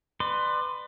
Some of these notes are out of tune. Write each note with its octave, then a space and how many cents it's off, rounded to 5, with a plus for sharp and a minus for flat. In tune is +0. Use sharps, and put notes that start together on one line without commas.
B4 +15 D5 +35 C6 +0